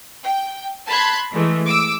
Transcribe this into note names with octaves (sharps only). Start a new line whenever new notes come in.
G5
A5 B5 C6 F#6 G#6
E3 G#3 A3
D6 E6